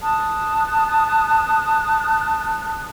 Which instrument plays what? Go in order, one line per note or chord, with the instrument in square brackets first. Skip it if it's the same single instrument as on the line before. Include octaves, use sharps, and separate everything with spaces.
[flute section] A5 D#6 F#6